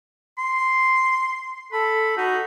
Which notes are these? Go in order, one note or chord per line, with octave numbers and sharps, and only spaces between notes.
C6
A4 B5
D#4 F#4